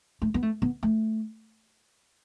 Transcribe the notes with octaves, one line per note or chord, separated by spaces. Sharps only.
A3
B3
A3
B3
A3